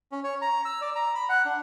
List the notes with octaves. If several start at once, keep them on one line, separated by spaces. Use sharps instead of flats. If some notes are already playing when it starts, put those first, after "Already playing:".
C#4
C#5
A#5
E6
D5
A#5
B5
F#5
D4